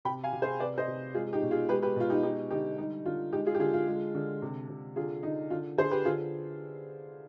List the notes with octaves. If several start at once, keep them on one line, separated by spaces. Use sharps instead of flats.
C3 G5 B5
F5 G#5
C3
G#4 C5
C3 B4 D5
C5 D#5
C3
G#3 F4 G#4
D#4 G4
B2
F4 G#4
G#3 G4 B4
G4 B4
B2 F4
D#4 G4
G#3 D#4 G4
D3 D#4 G4
G3 D#4
D3 F4
G#3 D#4 G4
F4 G#4
G4
D3 F4 G#4
F4
G#3
D3
C3
C3
D3 F4 G#4
D3 D#4
D3 F4
D3 G#4 C5
G4 B4
D3 F4 G#4